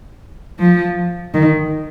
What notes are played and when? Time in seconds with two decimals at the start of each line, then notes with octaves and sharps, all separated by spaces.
0.59 F3
1.34 D#3